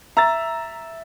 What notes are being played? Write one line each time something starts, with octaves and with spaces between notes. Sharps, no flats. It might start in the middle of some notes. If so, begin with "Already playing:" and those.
E5 A#5 A6